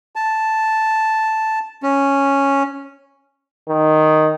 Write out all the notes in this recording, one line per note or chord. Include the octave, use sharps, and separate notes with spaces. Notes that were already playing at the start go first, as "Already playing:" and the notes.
A5
C#4
D#3